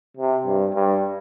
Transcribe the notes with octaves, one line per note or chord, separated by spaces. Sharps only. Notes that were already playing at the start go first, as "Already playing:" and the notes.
C3
G2
G2